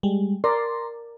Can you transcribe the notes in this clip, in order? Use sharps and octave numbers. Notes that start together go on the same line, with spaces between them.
G3 G#3
A#4 D5 A#5 C6